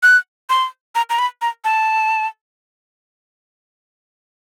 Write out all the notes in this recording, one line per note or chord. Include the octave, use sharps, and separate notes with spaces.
F#6
C6
A#5
A#5
B5
A#5
A5